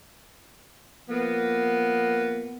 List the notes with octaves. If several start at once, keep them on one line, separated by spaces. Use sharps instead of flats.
F3 A#3 B3